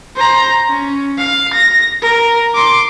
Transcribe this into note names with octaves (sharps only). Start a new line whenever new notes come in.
C5 A#5
C#4
F5
A#6
A#4
C6 D6